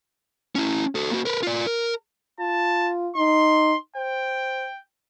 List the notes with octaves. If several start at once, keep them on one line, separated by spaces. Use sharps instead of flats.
C#4 E4
F#4 A4
A#3 F#4
A#4 B4
F4 D5
A#4
F4 A5
D#4 C6
C5 G5